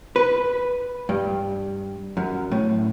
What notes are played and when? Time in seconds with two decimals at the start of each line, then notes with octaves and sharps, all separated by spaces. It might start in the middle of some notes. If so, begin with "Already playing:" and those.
0.16 B4
1.09 G2
2.17 F#2
2.52 A2